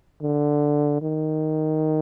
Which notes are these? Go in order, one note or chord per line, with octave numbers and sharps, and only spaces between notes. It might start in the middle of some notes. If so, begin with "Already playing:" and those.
D3
D#3